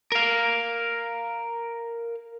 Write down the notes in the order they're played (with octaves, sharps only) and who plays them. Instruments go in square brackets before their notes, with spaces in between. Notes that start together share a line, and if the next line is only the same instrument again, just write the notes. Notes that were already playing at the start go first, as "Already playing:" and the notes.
[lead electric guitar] A#4 F5